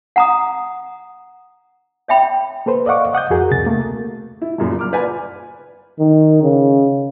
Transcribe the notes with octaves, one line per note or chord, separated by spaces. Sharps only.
F#5 A#5 D#6
C#5 E5 G5 B5
A#3 A4 B4 C5
D5 D#5 F5 F#5 C#6 D6
D#5 F#5 D#6 G6
F2 F#4 G#4 A#4
C#2 C3 A6
A3 A#3
E4
G1 F#2 A#2 C#3
D6 F6
F4 B4 D5 G#5
D#3
C#3